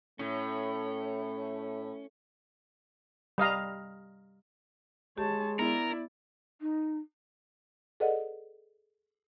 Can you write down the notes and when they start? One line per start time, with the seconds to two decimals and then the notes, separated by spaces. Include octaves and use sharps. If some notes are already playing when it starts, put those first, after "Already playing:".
0.19 A2 A3 C#4
3.38 G3 D#5 F5 A#5
5.18 G#3 G4 C#5 A5
5.59 B3 E4 A#4 D5
6.61 D#4
8.00 G#4 A4 B4 D5 D#5 F#5